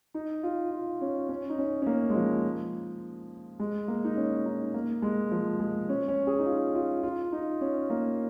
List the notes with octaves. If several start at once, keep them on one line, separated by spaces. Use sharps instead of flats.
D#4
F4
F4
C#4
C#4
D#4
C#4
C#4
A#3
G#3
F3
G#3
A#3
D#4
C#4
D#4
A#3
G#3
F3
G#3
C#4
C#4
G#4
D#4
F4
F4
F4
D#4
C#4
A#3